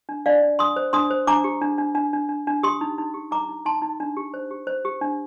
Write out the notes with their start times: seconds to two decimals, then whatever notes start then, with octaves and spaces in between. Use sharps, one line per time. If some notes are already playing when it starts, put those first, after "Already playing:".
0.09 D4
0.26 D4 D5 F5
0.42 D4
0.59 D4 C6 D#6
0.76 C5
0.93 D4 C6 D#6
1.10 C5
1.27 D4 A#5 D6
1.44 G4
1.61 D4
1.78 D4
1.95 D4
2.13 D4
2.29 D4
2.47 D4
2.63 G4 C6 D#6
2.81 D#4
2.98 D#4
3.14 G4
3.31 D#4 A#5 D6
3.48 D#4
3.65 D#4 A5 C6
3.82 D#4
4.00 D4
4.17 G4
4.34 C5
4.51 G4
4.67 C5
4.85 G4
5.01 D4